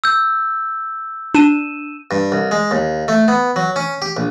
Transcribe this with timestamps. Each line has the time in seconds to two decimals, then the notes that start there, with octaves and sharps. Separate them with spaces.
0.04 E6 G6
1.35 D4 D#7 E7
2.11 G2
2.32 C2
2.51 G#3
2.71 D#2
3.08 A3
3.28 B3
3.56 F#3
3.76 C#4
4.02 G4
4.17 A#1